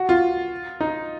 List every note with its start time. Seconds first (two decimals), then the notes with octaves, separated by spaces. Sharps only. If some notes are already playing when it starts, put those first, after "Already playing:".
Already playing: F#4
0.09 F4
0.80 D#4